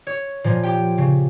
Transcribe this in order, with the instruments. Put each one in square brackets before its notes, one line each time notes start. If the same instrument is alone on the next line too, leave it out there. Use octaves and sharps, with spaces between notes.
[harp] C#5
A#2 F3
G4 G5
C#3